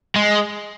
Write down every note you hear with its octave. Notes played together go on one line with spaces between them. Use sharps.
G#3